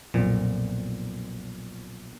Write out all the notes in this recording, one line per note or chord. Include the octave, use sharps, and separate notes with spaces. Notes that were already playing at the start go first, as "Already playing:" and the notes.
B1 F2 A#2